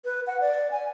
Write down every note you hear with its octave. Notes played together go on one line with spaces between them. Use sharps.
B4
F#5
D5
G#5